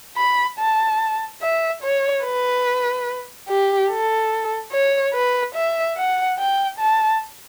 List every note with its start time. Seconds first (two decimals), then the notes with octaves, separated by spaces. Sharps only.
0.17 B5
0.59 A5
1.42 E5
1.83 C#5
2.24 B4
3.49 G4
3.90 A4
4.72 C#5
5.14 B4
5.55 E5
5.97 F#5
6.39 G5
6.79 A5